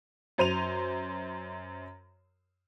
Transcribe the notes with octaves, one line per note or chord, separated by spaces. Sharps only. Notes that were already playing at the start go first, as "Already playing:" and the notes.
F#2 C5 D#7 F7